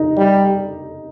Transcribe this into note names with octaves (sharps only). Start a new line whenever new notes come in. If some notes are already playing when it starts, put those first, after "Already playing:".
Already playing: D#4
G3